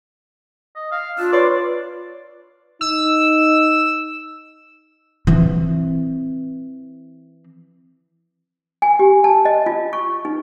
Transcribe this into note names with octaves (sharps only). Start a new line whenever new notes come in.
D#5
F5
D4 F4 E6
B4 C#5 D5 C6
D#4 E6
E3 C4
G#5
G4
A5
D#5
F4
C#6
D#4